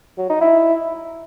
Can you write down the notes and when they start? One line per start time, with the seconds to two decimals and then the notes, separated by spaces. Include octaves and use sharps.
0.18 F#3
0.29 D#4
0.41 E4